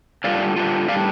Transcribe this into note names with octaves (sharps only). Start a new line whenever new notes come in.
D3 G3 D4 F4 D5 F5
D3 G3 D4 F4
A2 G3 D4 D5 F5